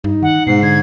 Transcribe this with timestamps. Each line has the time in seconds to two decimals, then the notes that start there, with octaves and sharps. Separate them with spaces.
0.04 G2 D#4
0.23 D#3 F#5
0.47 G#2 B2 C7
0.63 D3 G#6